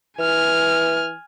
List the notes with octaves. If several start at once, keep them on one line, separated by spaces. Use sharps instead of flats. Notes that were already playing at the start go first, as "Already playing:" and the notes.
E3 G#5 F6